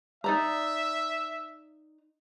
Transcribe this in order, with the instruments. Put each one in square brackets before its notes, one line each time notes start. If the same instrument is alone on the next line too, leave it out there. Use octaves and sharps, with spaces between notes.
[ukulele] D#4 D5 A#5 [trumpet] E5